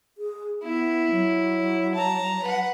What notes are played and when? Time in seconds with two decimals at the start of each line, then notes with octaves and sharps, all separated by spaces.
0.18 G#4
0.63 B3 E4
1.11 F#3
1.95 A5 A#5
2.43 B4 F#5